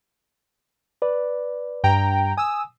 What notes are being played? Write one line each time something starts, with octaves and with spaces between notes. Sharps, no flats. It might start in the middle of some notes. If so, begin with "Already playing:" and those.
B4 D5
G2 G5 A#5
G#5 D#6 E6